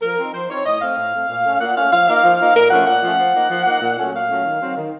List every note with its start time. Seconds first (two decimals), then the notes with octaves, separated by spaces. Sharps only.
0.02 F3 A#4
0.19 C4 D#4
0.33 F3 C5
0.50 C4 D#4 C#5
0.66 A2 D#5
0.81 A3 C4 F5
0.97 A2
1.13 A3 C4
1.28 A#2
1.45 A3 C#4
1.60 A#2 F#5
1.76 A3 C#4 F5
1.92 F3 F5
2.08 A#3 D#4 F5
2.24 F3
2.39 A#3 D#4
2.55 A#2 A#4
2.71 F3 A3 C#4 F#5
2.87 A#2 F#5
3.03 F3 A3 C#4
3.18 F3
3.34 A#3 D#4
3.50 F3
3.66 A#3 D#4
3.81 A#2
3.98 F#3 A3 C#4
4.13 A#2 F5
4.30 F#3 A3 C#4
4.45 D#3
4.61 F#3 C4
4.77 D#3